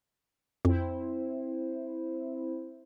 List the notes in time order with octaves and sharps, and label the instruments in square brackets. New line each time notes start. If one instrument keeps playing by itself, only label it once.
[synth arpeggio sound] F2 [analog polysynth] C4 E4 C5